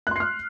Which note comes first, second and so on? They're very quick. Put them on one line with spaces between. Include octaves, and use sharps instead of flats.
F#6 C6 C7 F6